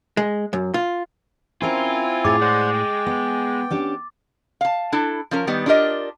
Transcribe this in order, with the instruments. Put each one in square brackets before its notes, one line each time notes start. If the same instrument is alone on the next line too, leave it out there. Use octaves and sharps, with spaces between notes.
[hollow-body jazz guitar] G#3
F#2
F4
[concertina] C4 E4 G#5 [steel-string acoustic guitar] C#4 A#4 C5 [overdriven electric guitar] F4
[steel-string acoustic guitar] A2 G#4 C#5 [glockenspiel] D6 A6
[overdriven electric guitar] G#3 [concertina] C5 D5 F#5
[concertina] G5
[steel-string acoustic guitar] B3
C#4 D4 G4
[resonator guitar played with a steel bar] F5 A5
D4 E4 A4
F3 C#4 A#4
D#3 G3 B3
D4 F4 G4 A#4 D#5